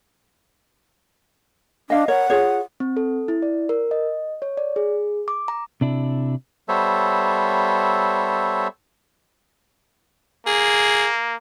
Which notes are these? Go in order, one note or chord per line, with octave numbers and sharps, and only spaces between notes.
D4 D#5 F5
A#4 C#5 F#5
F4 G#4 C#5
C4
A4
E4
D5
A#4
D#5
C#5
D5
G#4
D6
A#5
C3 D4 E4
G3 B3 A4 C5 C#5 E5
A#3 G#4